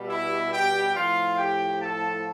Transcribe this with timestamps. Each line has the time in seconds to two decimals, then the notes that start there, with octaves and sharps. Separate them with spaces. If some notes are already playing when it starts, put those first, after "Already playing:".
Already playing: B2 G3
0.08 E4 E5
0.51 G4 G5
0.94 A2 F3 F4 F5
1.37 G4 G5
1.81 A4 A5